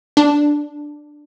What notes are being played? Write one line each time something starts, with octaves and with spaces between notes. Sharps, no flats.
D4